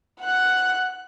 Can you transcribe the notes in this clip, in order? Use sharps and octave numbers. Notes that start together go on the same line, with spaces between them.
F#5 F#6